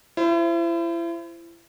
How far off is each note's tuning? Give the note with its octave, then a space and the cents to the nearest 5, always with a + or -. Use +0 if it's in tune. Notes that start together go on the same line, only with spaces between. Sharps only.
E4 +35 C5 +0